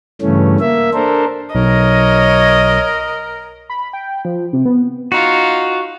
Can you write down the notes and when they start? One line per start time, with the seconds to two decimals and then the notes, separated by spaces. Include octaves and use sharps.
0.22 G2 C#3 E3 A3 C#4
0.60 A#3 E5
0.94 D4 A4 A#4 C5
1.55 B1 A#4 C#5 D#5
3.70 B5
3.93 G5
4.25 F3
4.53 C3
4.66 B3
5.12 D#4 F4 F#4